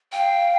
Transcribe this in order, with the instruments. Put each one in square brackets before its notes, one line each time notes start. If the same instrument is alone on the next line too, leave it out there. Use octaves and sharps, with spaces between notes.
[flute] F5 [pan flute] G5